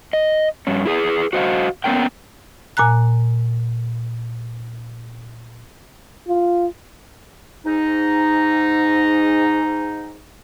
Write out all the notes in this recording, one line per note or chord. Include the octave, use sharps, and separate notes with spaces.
D#5
G2 C#4
E4 G#4 B4
F#4 C5 D#5 F5
A#3 B3 C#4 A#4 G5
A#2 G#5 A#5 F#6
F4
G#2 D#4